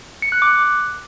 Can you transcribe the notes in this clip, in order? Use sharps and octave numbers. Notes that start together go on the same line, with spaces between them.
C#7
F#6
D6
F#6